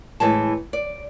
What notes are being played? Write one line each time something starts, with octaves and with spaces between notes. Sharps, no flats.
A2 E3 G#3 A5
D5